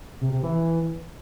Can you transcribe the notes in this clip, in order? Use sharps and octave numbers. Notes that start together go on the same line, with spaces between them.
C3
C3
E3